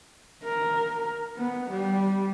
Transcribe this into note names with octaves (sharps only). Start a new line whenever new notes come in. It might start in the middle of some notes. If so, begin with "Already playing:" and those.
A#4
B3
G3